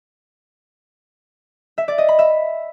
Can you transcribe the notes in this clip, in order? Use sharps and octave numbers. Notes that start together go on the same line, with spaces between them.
E5
D5
D#5
B5
E5